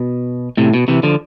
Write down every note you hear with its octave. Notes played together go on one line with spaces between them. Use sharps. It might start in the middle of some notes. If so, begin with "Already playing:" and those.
Already playing: B2
A2 C3
B2
C3 E3
D3 F3